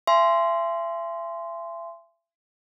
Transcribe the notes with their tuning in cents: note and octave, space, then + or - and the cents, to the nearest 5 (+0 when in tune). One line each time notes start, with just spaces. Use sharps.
E5 +40 G#5 +0 C6 -10